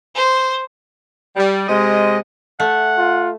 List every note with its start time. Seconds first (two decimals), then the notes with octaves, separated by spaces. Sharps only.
0.15 C5
1.36 G3
1.68 C3 G#3 D#5
2.60 A3 F#5
2.98 F4